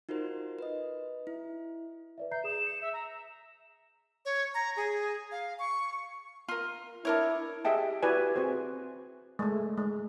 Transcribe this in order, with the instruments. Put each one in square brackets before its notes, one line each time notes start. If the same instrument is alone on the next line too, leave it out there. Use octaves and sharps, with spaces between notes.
[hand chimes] D#4 F4 F#4 A#4 C5
B4 D#5
E4
[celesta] B4 D5 E5
[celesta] E5 A#5 C7 [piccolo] G6
[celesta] G#4 D#6 [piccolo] E7
[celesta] C#7
[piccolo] E5
A#5
[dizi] C#5
A#5
G#4
F5
C#6
[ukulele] F4 A#4
[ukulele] D4 A#4 C#5 [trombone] E4
[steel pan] G4 G#4 D#5 E5 G5 A5
E4 F#4 G4 B4 D5 G#5
C4 F#4 G#4 C5
G#3 A3
G#3